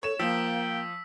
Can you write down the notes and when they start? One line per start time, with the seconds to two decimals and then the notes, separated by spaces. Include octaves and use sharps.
0.03 A4 C#5 E7
0.19 F3 A#3 G5 E6 B6